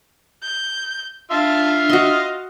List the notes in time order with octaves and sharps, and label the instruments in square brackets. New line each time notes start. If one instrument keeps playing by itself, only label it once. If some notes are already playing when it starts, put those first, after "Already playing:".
[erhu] G6
[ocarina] D4 [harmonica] F4 E5 F5 [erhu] A5
[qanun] F#4 C6 [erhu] D#5